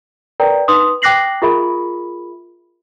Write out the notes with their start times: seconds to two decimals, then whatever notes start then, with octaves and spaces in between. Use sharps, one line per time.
0.40 A#4 B4 D5 G5 A#5
0.68 D#4 B4 C6 D#6
1.02 G5 D6 F#6 A#6 C7 F#7
1.42 F4 G#4 A#4 E5 B5